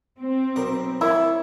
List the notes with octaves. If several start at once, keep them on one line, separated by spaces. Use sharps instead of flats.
C4
B1 A#4
D#3 A#3 C#4 E4